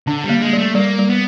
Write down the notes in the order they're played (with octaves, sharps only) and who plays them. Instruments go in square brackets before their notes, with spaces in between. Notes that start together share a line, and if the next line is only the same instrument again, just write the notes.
[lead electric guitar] D3 [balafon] D4
[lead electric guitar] G3
[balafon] A#3
[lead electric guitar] G#3
[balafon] G3 [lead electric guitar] A3
[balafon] G3 [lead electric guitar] A#3
[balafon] G3
[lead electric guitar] B3